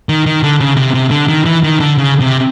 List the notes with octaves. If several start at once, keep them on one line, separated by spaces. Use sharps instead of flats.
D#3
D#3
D3
C#3
C3
C3
D3
D#3
E3
D#3
D3
C#3
C3